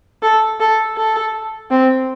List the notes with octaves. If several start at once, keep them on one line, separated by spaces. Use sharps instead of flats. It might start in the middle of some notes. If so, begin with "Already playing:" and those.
A4
A4
A4
C4